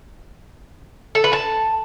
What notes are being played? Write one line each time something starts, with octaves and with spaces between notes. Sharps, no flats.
A4
B4
A5